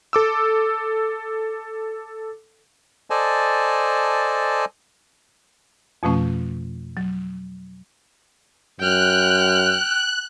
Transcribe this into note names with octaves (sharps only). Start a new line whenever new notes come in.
A4 D6 E6
A4 C5 D5 D#5 G#5 A5
F2 B2 F3 A3 C#4
F#3
F#2 G5 F6 F#6